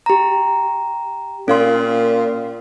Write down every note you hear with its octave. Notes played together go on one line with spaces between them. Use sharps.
G4 A#5
A#2 C#4 F5 C6